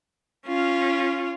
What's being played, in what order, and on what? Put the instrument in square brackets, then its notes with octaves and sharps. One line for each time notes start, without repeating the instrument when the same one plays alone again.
[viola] C#4 F4